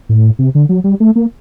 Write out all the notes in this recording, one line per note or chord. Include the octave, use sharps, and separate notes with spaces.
A2
C3
D3
F#3
G3
A3
A#3